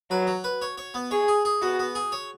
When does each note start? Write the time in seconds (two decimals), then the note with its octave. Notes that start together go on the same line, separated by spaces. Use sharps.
0.11 F#3 B4
0.27 F#3
0.44 B4
0.62 C#5
0.78 C#5
0.94 B3
1.11 G#4 C#5
1.28 G#4
1.45 G#4
1.62 B3 F#4
1.79 B3
1.95 G#4
2.12 C#5